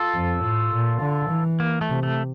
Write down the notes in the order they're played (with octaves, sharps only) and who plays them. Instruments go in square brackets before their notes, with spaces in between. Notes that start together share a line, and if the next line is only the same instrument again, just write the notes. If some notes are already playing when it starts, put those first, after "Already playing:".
Already playing: [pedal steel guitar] F4 A4
[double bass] F2
A2
A#2
D3
E3
[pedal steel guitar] A#3
A3
[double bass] C3
[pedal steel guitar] A3